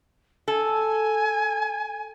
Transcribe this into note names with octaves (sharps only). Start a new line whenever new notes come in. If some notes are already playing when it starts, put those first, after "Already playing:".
A4 G#5